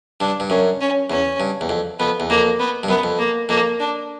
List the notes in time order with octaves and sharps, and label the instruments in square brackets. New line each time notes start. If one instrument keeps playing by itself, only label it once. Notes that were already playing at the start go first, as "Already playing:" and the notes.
[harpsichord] G2 [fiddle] D4
[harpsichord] G2
[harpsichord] F#2 [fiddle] C#4
[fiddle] C#4
[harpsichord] E2 [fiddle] C#4
[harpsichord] G2
E2
F2
[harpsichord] F2 [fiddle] B3
[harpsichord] E2
[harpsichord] F2 [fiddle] A#3
[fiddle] B3
[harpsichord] G2
[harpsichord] F#2 [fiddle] B3
[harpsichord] F2
[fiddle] A#3
[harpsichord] F2 [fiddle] A#3
[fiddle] D4